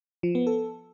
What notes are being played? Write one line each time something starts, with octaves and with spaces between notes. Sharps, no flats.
F3
B3
A4